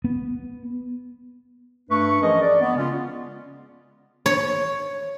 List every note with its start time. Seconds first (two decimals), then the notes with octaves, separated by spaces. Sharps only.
0.04 B3
1.89 G2 A3 D4 B4 C#6
2.21 E3 F3 C#4 G#4 A#4 D#5
2.41 D5
2.61 B3
2.76 C#3 G#3 C#4 F4
4.26 C#5